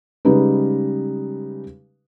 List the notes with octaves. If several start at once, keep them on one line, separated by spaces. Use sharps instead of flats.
C#3 G3 G#3 D#4 B4